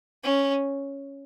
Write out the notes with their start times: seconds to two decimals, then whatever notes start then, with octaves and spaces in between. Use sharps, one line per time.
0.24 C#4